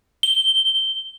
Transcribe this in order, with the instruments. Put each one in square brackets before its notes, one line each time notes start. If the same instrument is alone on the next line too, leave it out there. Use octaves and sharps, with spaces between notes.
[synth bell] G7